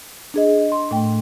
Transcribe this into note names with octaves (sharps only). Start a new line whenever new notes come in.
D4 G#4 D#5
C6
A2 A3 G5